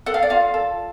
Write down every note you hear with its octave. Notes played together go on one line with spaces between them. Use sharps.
A4 F#5
F5
D5
F4 F5
A4